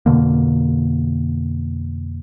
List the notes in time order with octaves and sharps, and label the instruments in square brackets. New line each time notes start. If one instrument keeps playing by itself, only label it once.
[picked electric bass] F2 B2 D3 A#3